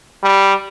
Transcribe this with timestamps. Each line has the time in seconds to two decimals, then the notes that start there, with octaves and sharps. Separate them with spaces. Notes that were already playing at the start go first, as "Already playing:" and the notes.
0.23 G3